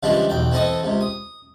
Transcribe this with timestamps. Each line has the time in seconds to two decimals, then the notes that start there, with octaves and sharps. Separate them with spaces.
0.03 C#3 E3 F3 G3 G#3 D4
0.30 B1 E2 G5
0.51 E3 C4 A4 D#5 D#6
0.83 C#2 C3
1.01 D#6